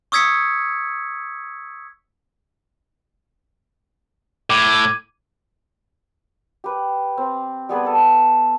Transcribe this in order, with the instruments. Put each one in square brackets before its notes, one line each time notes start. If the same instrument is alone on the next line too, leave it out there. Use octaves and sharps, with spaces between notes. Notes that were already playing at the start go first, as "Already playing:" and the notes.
[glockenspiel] C#6 D#6 E6 G#6 B6 C#7
[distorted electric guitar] A2 [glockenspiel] D6 G#6 D#7
[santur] G4 B4
C4
G3 B3 G#4 B4
A4 B4